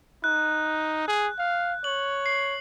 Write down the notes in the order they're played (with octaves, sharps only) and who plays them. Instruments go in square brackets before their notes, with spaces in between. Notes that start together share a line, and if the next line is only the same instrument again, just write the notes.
[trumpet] D#4 [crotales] F#6
[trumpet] G#4
F5
[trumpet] C#5 [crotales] F#7
[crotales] C7